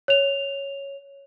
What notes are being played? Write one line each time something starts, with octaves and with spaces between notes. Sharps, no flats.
C#5 F7